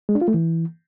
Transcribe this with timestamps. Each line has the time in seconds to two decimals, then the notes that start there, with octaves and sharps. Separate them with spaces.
0.09 G#3
0.15 D4
0.21 F4
0.28 A3
0.34 E3